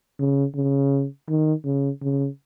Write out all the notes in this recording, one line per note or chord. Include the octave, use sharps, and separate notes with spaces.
C#3
C#3
D#3
C#3
C#3